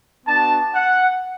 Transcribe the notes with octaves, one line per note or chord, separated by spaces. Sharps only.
B3 D4 F#4 A5
F#5